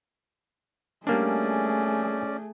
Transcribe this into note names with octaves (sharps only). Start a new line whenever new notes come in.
G3 A3 A#3 C#4 D4 G#4 D5